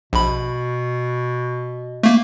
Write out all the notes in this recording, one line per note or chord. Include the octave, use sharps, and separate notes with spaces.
A#1 B2 B5
A3 A#3